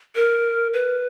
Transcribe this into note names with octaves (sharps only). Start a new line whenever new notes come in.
A#4
B4